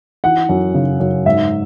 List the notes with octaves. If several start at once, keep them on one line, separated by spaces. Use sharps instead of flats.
E3 F#5
F#2
C#3
F#2
G#2 E5